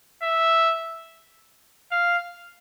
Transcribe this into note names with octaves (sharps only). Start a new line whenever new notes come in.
E5
F5